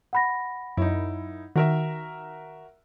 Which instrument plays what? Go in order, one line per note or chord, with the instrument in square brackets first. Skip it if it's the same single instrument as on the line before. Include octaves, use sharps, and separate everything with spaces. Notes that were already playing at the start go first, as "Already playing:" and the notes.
[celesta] F#5 B5 A#6
[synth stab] F#2 [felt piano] D#4 E4
[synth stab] D#3 [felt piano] F#4 A#4 E5